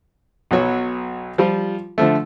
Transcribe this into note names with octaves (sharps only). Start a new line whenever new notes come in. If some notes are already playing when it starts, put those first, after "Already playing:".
B1 B2 F#3 F#4 C#5
F3 G3 F4
D3 F3 A3